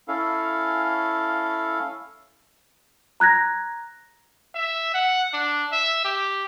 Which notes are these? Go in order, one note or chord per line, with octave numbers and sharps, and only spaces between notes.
C#4 E4 A4 F5
A#5 F#6 G#6 A#6
E5
F#5
D4
E5
G4